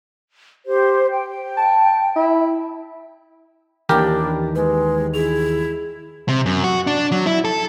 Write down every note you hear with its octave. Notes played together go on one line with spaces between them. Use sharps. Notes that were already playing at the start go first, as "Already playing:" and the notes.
G4 C5
G5
A5
E4
D#2 E3 D4 G4 A#4
G#3 B4
E4 G#4 F7
C3
F#2
F#4
D4
F#3
E4
A4